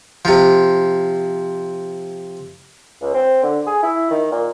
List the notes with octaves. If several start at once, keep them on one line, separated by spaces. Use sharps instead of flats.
C3 F3
C#2
C4
D3
G#4
E4
D#3
A#2